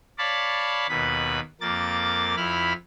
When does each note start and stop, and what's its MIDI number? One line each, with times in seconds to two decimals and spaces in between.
0.18 0.87 73
0.18 0.87 74
0.18 0.87 77
0.18 0.87 81
0.18 0.87 83
0.89 1.40 39
0.89 1.40 47
0.89 1.40 71
0.89 1.40 83
1.61 2.36 41
1.61 2.36 58
1.61 2.36 86
1.61 2.36 93
2.37 2.73 41
2.37 2.73 64
2.37 2.73 83
2.37 2.73 89